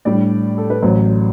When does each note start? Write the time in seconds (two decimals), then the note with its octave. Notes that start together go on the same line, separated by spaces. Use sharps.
0.05 A2 G3 D4 D5
0.58 A4
0.70 B4
0.82 A1 A2 F#3 C5